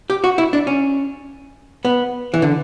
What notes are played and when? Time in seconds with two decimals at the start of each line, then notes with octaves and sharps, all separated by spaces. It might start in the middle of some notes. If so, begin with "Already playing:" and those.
0.10 G4
0.24 F#4
0.38 E4
0.53 D4
0.67 C#4
1.85 B3
2.34 E3
2.42 D3